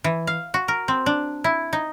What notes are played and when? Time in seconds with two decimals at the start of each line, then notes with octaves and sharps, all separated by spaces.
0.04 E3
0.27 F5
0.54 F#4
0.68 A#4
0.88 C4
1.06 D4
1.44 E4
1.73 D#4